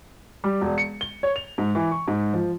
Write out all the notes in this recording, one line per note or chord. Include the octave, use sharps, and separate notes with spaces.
G3
E1
C#7
G7
C#5
F7
G#2
E3
C#6
G#2
F3